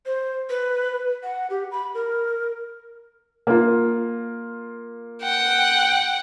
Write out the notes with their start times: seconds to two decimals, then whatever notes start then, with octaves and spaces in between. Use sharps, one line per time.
0.06 C5
0.49 B4
1.23 F#5
1.50 G4
1.71 B5
1.94 A#4
3.47 A#3 F4
5.23 F#5 G5